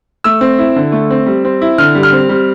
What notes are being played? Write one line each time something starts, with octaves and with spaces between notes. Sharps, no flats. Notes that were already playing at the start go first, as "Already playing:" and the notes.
A3 E6
C4
E4
D3
A3
C4
G3
C4
E4
D3 F6
G3
F6
C4
G3